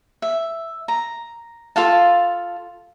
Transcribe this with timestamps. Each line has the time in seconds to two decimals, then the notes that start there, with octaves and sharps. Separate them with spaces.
0.22 E5
0.88 A#5
1.76 F4 A4 F5 A5